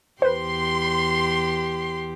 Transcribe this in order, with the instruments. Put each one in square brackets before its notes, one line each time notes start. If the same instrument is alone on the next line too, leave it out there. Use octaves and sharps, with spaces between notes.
[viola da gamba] E2 G4 [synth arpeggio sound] B4 C5 [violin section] C6